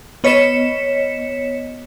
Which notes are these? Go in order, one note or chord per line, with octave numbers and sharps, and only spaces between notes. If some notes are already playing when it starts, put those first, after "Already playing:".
B3 C#5 D#5 B6 C#7 E7